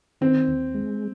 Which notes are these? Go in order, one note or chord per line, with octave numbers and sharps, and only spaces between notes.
D#3 C4
D#2
G#3